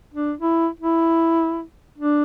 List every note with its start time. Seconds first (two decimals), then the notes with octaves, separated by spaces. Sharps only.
0.14 D4
0.40 E4
0.80 E4
1.98 D4